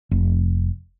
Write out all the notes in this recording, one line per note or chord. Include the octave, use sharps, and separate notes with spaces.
F1